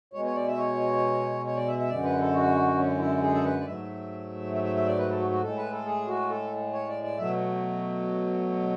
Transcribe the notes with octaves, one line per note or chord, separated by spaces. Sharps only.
B2 G#3 C#5
C#5
D5
E5
C#5
C#5
D5
E5
E5
F#2 D3 G#3 D5
B4
A4
F#4
C#4
E4
G#4
A4
B4
D5
G#2 F#3 A3 E5
E5
E5
E5
D5
B4
A4
F#4
F#4
A2 G#3 A4
B4
A4
G#4
F#4
A4
C#5
D5
D5
B2 F#3 A3 E5